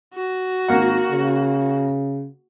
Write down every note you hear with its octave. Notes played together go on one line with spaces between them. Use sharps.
F#4
G#1 A#3 F#5
C#3